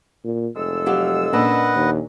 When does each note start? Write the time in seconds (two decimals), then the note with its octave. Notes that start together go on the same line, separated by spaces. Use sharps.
0.24 A#2
0.56 F1 G#3 A4 E6
0.86 F#3 G4 F5
1.33 A#2 C#4 D4 B4 D#5 F#5
1.75 D#2